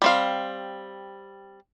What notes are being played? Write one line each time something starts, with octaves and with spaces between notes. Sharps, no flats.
G3 C4 F5